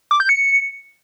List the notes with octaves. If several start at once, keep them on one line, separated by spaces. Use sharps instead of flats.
D6
G6
C#7